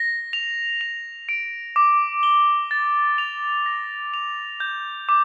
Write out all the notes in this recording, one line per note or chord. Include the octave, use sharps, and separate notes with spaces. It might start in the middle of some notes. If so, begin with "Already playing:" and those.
Already playing: A#6
F7
F7
D7
D6
G7
A6
F7
A#6
F7
G6
D6